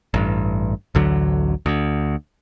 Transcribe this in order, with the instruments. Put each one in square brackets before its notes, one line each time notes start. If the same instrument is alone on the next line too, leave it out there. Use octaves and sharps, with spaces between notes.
[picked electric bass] A1 G2
A1 D2 D3 F#3
D2